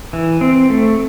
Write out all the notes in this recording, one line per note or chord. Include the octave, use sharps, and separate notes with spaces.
E3
C4
A3